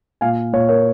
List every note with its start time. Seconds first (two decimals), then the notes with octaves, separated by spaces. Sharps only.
0.21 A#2 F5 G#5
0.53 A#2 C#5 F5
0.68 A#4 C#5